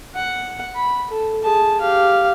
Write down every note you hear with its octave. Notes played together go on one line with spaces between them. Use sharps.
F#5
B5
A4
G#4 A5
G4 F5